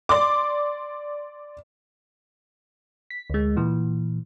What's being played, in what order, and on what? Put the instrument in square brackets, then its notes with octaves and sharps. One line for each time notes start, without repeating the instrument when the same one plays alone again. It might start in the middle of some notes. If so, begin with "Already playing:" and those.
[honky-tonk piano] D5 C6 D6
[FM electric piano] B6
D2 G#3
A#2 E3